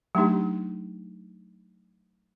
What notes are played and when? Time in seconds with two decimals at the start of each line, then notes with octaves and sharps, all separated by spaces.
0.15 F#3 A3 D4 D#4 G4